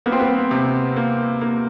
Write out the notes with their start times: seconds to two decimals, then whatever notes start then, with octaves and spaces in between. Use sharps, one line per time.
0.06 A#3 B3
0.12 C4
0.19 B3
0.51 C3
0.96 A#3
1.41 A#3